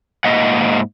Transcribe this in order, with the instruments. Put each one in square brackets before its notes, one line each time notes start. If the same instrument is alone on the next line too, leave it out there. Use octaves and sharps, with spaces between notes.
[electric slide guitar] G#2 A#3 D#5 F#5